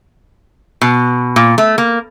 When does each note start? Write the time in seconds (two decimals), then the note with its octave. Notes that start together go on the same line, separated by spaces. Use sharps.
0.81 B2
1.36 A#2
1.58 A3
1.78 A#3